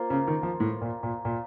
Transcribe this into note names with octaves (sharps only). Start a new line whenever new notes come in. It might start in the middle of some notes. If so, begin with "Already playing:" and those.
Already playing: A#3 F4 C5
C#3
D#3
F3
A2
A#2
A#2
A#2